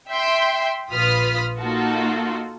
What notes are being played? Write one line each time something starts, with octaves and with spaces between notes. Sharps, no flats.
E5 G5 C6
A#1 F4 B4 D#6 F6 B6
A#3 D#4 F4 F#4 A4